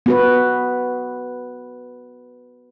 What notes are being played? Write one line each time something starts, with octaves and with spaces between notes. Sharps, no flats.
B3 F#4 B4